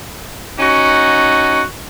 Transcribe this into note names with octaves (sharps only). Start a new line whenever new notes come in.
C#4 D#4 F#4